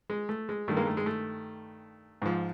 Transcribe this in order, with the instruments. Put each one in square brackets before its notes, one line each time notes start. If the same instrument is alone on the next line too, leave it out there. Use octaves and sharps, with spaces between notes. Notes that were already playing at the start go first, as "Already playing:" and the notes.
[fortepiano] G#3
A3
G#3
G2 D#3 A3
G#3 A#3
A3
G#3
A3
G#2 F3